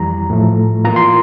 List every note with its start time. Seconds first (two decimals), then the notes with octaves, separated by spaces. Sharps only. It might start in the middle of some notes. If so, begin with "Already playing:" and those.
Already playing: F2 E3 G3 A#5
0.30 A2 F3 A3
0.85 E3 A#3 F4 A#5
0.96 C6